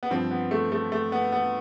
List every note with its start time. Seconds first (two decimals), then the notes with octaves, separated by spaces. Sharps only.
0.03 B3
0.10 G2 F3 C4
0.31 B3
0.51 A3
0.72 A3
0.92 A3
1.12 B3
1.32 B3